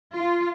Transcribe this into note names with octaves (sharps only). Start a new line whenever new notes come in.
F4